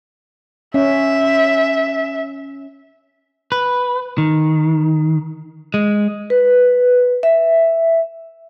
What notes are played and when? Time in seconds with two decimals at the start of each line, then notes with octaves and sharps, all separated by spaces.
0.74 C#4 E5
3.52 B4
4.18 D#3
5.74 G#3
6.30 B4
7.23 E5